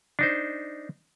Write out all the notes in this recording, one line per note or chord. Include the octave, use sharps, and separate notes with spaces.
D4 D#4 C5